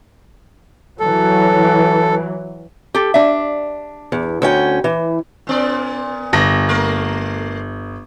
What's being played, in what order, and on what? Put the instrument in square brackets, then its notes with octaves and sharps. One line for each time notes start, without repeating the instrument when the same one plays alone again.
[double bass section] E3 F#3 [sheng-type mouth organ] A4
[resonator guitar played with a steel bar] G4 A4
D4 E5
[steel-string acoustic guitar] E2
D2 C#4 G5
E3
[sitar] A#2 B3 D5
[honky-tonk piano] G1 A#6
[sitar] A3 A#3 A#4